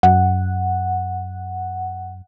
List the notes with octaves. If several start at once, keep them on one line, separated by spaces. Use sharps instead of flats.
F#2 F#5